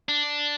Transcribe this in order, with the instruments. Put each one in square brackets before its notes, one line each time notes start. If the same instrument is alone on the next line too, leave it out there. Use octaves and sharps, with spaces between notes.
[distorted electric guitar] D4